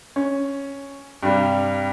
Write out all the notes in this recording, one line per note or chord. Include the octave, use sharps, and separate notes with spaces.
C#4
G2 C3 G3